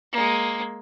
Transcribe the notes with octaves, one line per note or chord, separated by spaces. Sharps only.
G#3 A#3